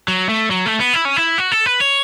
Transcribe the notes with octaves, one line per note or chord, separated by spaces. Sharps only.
F#3
A3
F#3
A3
B3
E4
C#4
E4
F#4
A4
B4
C#5